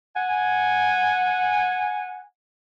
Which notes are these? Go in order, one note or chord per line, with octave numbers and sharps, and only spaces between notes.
F#5 G#5